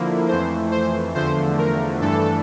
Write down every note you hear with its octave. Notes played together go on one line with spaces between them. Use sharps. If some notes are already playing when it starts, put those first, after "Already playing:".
Already playing: D3 F3 A#3 E4
F2 E3 A3 C5
C5
E2 D3 F3 A3 C5
A#4
G2 E3 A3 D4 A4